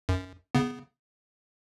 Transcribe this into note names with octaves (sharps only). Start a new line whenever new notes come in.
F#2
C#3 B3